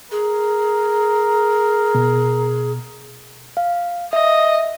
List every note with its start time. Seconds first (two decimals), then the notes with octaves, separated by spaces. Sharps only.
0.11 G#4 A#4
1.95 B2
3.57 F5
4.13 D#5 E5